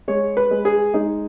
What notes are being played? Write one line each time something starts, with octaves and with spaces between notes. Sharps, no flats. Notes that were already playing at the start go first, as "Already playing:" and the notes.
G#3 C#5
B4
G#3
G#4
G#3 D#4